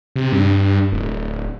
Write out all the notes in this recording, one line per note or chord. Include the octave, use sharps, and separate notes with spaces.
C3
G2
D1